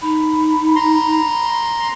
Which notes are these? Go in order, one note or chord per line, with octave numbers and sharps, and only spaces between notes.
D#4 B5
A#5 C6